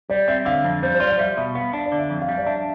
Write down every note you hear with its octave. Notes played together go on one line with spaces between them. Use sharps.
G3 D5
C4 E5
D3 F5
F2
G3 C5
C5
F4 D5
F5
G3 E5
B2 E5
B3 F5
D4 F5
D5
D3
E5
F2
F5
G3
D5
D4 E5